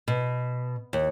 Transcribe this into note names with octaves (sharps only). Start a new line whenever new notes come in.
B2
D#2